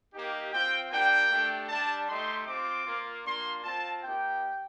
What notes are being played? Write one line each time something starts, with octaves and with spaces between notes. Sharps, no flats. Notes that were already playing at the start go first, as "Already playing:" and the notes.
A#3 D#4 G4
C4 F4 G5
A#3 D4 G4 G5
A3 D4 G4
G3 D4 G4 A5
A3 D#4 G4 C6
C4 D6
F4
A#3 F4
A#3 D4 F4 C6
C4 F4 A5
A#3 D#4 G4 G5